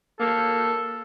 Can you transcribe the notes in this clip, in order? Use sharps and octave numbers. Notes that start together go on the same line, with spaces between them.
A#3 A4